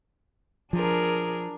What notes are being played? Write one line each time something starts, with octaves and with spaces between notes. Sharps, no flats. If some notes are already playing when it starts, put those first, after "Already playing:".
F3 D4 G#4 A#4